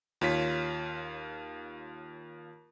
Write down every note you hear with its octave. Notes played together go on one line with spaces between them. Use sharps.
D#2 F4 C#5 B6